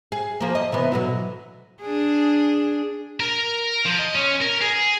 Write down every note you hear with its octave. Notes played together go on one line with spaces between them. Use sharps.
G#4
F3 A#3
D#5
C3 E3 B3
B2 D3 F#3
D4 G#4
A#4
F3
D#5
C#4
A#4
G#4